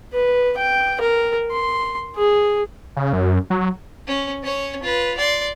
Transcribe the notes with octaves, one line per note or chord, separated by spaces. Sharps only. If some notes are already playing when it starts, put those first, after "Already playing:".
B4
G5
A#4
C6
G#4
C#3
F#2
F#3
C#4
C#4 C#5
F4 B4
D5 C6